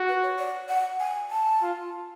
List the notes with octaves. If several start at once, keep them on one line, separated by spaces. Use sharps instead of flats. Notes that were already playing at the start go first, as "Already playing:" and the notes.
Already playing: F#4
B4
C#5
D5
F#5
G#5
A5
F4